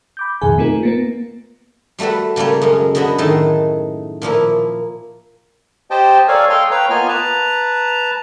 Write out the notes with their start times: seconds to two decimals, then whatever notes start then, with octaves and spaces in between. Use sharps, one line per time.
0.17 B5 D6 G6
0.41 F2 G#2 B2 D#3 G#4 G#5
0.58 A3 C4 D#4 F4 A#4
0.83 A#3 B3 A#4
1.99 G3 A3 F#4 A4 B4
2.36 C#3 G3 A3 A#3 C#5
2.62 F#2 G#3 C#4
2.95 D3 B3 F#4 D#5 B5
3.18 A2 D#3 A3 G#4 D#5 A5
4.22 A#2 F3 A#3 E4
5.91 G4 C5 D#5 G5 A5
6.28 A4 A#4 C#5 D5 F5 G#5
6.50 A4 D#5 F5 G5 C6 F6
6.71 B4 C#5 F5 G5 A#5
6.90 A#3 B3 F4 D#5 G#5 F6
7.09 B4 A5 A#5